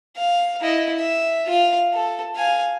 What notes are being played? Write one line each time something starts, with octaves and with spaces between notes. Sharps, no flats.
F5
E4 D#5
E5
F4 F5
A4
F5 G#5